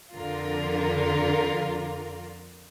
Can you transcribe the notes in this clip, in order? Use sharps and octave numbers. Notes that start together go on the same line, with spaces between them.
F2 D3 F4 A#4